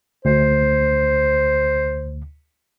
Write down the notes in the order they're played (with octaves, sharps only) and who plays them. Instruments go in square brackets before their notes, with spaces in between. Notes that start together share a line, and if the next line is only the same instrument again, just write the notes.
[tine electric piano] D2 [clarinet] C5